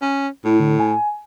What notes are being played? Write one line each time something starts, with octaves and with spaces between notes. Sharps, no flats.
C#4
A2 E4
D3
G#5